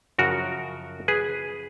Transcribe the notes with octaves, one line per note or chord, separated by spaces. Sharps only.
F#2 C#3 F3 F#4 A#4
G#4 B4